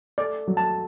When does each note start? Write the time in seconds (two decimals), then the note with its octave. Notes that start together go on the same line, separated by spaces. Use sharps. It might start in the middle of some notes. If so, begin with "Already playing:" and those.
0.18 A3 D5
0.47 F#3
0.57 A3 A5